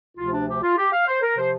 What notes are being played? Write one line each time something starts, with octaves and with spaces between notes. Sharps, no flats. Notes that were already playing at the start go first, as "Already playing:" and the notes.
D2 C3 F3 F4
D4
G4
F4
G4
F5
C5
A#4
C3 F3 C5